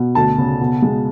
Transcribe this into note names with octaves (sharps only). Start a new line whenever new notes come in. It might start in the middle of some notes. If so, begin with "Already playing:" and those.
Already playing: B2
D2 A5
C#3
B2
G#3